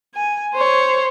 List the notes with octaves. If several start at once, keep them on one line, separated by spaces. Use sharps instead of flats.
G#5
C5 C#5